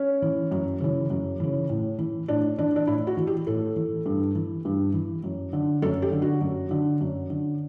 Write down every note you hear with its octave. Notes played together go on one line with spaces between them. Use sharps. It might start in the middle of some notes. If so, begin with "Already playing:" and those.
Already playing: C#4
E3
F#2
C#3 E3
F#2
C#3 E3
A2
E3
A2 D4
E3 D4
D4
A2 E4
F#4
E3
G4
A2 A4
E3
G2
E3
G2
E3
F#2
D3
F#2 A4
G4
D3
F#4
F#2
D3
F#2
D3